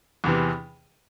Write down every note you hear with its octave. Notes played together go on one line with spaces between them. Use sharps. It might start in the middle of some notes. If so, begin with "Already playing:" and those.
E2 C3 E3